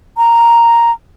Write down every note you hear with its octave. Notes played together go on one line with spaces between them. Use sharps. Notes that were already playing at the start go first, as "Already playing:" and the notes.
A#5